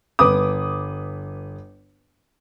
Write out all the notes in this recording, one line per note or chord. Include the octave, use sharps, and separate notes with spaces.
G1 B4 D6 D#6